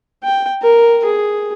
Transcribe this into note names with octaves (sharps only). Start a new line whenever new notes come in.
G5
A#4
G#4